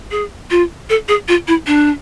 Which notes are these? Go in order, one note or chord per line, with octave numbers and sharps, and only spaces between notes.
G#4
F4
A4
G#4
F4
E4
D4